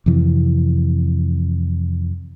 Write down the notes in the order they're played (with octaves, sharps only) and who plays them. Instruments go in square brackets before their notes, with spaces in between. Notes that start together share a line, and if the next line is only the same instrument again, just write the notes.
[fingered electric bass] F2 C3 E3